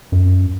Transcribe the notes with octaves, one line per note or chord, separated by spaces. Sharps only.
F#2